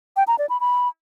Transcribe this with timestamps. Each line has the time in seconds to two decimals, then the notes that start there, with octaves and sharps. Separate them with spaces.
0.17 G5
0.28 A#5
0.39 D5
0.49 B5
0.60 B5